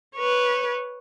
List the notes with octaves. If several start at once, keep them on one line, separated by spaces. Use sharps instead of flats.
B4 C#5